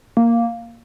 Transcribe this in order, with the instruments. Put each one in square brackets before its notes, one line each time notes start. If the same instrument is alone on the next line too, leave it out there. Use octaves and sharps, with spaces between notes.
[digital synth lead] A#3